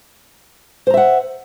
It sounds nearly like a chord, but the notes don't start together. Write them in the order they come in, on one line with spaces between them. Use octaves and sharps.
C5 A#5 E5 F#5